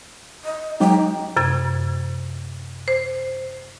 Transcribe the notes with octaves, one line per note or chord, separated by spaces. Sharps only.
D#5
F#3 G#3 D#4 G5
F#2 C3 G#6
C5